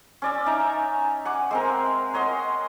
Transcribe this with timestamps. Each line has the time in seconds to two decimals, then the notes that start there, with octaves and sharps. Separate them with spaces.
0.22 C#4 D5 E6
0.46 C#4 D#4 E5 A#5
1.25 F#5 G#5 D6
1.51 G#3 C4 A#4
2.14 C#5 D#5 F#5 C6